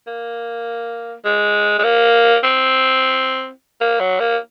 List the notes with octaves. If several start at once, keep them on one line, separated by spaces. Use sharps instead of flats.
A#3
G#3
G#3
A#3
C4
A#3
F#3
A#3